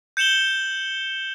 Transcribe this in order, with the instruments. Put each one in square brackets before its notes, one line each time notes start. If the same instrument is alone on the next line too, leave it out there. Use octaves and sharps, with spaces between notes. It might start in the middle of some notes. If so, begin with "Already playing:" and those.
[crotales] G6 C#7 E7 F#7 G7